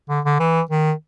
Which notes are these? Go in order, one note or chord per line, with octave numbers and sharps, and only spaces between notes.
D3
D3
E3
D#3